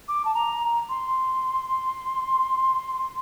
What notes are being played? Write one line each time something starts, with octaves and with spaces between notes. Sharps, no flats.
D6
A5
A#5
C6